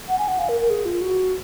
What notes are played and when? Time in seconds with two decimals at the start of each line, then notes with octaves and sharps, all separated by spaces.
0.08 F#5
0.18 G#5
0.28 F#5
0.39 F5
0.49 A#4
0.60 A#4
0.70 G#4
0.85 F4
1.02 F#4